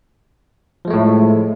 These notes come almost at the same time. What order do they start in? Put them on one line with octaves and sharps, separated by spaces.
F3 G#3 A3 A2